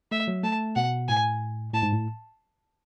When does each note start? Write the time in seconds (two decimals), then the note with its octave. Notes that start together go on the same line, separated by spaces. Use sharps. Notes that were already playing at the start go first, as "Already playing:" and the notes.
0.12 A3 E5
0.28 F#3
0.43 A3 A5
0.76 B2 F#5
1.08 A2 G#5
1.73 A2 A5
1.83 G#2
1.92 A2